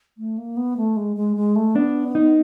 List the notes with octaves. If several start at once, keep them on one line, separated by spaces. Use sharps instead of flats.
A3
A#3
B3
A3
G#3
G#3
G#3
A3
B3 D4
D#4